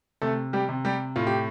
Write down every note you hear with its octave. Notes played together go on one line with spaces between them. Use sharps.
C3 A3 A4
G3 G4
C3
G3 G4
A2 F4
G4